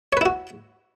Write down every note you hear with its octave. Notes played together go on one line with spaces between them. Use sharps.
E4 F#4 B4 C#5